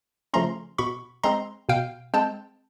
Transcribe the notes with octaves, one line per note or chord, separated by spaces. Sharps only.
C#3 F3 A3 C#4 A#5 C6
B2 B5 C#6
G#3 C4 A#5 C6
B2 F5 G5
G#3 C4 G5 A5